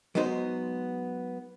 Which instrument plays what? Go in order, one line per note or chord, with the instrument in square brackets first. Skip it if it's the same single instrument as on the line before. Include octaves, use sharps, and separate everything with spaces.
[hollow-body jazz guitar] F#3 G#3 B3 D#4 C5